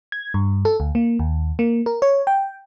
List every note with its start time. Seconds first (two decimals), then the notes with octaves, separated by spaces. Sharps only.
0.12 G#6
0.34 G2
0.65 A4
0.80 D2
0.95 A#3
1.19 D#2
1.59 A#3
1.86 A#4
2.02 C#5
2.27 G5